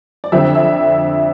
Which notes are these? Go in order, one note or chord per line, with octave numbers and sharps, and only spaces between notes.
D5
F2 D3 F3 C4 E5
E5